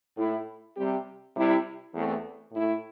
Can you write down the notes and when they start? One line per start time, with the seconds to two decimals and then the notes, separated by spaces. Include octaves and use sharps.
0.17 A2 A3 E4
0.76 C3 G3 C4 G4
1.34 C3 G3 E4 G4
1.93 E2 E3 A3 C4
2.52 A2 A3 E4